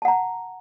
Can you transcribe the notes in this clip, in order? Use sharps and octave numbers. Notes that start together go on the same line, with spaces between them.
F#5 A5 A#5